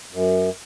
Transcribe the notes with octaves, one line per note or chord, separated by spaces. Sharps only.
F#2